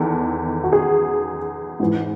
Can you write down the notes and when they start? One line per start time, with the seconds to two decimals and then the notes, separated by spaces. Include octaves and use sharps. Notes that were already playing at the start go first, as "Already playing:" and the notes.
Already playing: E2 D#3 A4
0.64 F#4
0.72 G#4
1.80 G#2 E3